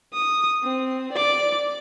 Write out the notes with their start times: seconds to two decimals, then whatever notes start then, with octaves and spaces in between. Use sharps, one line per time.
0.14 D#6
0.63 C4
1.13 D5 D6